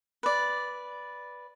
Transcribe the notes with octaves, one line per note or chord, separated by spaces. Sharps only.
B4 D5